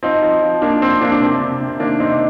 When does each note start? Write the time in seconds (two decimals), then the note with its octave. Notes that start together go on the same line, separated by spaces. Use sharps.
0.03 F3 C4 D#4
0.22 F3
0.42 F3
0.62 F3 A#3 D4
0.81 F3 C4
1.01 F3 A#3 D4
1.12 D4
1.20 C3 C4
1.41 C3
1.61 C3
1.80 D#3 A#3 D4
2.00 C3 C4 D#4